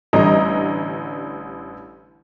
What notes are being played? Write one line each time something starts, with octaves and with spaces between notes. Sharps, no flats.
A1 D3 G3 D#5 A#5